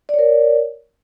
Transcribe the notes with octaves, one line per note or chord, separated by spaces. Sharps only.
A#4 C#5 D5